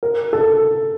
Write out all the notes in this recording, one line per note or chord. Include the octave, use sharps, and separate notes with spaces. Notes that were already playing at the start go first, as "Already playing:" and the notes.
A#4
A4